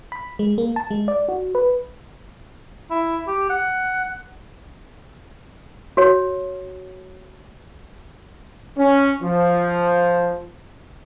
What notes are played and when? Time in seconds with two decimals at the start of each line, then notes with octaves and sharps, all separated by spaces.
0.12 B5
0.39 G#3
0.58 A#3
0.76 A5
0.91 G#3
1.08 D5
1.29 F#4
1.55 B4
2.90 E4
3.27 G4
3.50 F#5
5.97 F#4 C#5
8.78 C#4
9.22 F3